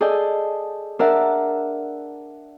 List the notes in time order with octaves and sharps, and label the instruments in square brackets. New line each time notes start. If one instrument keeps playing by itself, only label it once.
[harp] G#4 A4 D5 D#5 G5
D4 A#4 D5 E5 F#5